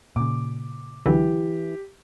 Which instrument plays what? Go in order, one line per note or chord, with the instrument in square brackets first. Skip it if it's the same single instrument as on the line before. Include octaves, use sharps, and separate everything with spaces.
[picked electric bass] A#2 C#3 [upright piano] D6
[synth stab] C#2 D3 F#3 [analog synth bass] E3 [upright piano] G4